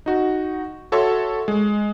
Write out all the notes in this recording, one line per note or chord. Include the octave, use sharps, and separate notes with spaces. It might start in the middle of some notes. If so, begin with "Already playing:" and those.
D#4 F#4
F#4 A4 C#5 E5 C6 C#6
G#3